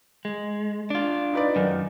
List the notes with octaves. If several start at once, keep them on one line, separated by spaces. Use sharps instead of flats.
G#3
D4 F4
D#4 B4 D5
F#2 D#3